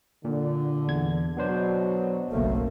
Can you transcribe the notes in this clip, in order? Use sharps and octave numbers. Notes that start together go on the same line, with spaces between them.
A#2 D3
E2 G#6
B2 F#3 B3 D4 C5
F#1 B1 A3 A#3